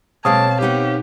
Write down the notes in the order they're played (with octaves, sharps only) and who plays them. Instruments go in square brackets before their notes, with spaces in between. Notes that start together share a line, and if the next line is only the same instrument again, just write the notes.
[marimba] B2 [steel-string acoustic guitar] F#3 G#3 A#3 [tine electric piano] C4 C#5 F5 [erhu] A5
[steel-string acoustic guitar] B3 D#4 F#5 [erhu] G4